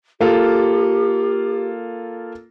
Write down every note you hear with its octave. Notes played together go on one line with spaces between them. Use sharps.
A#3 F4 G4 A4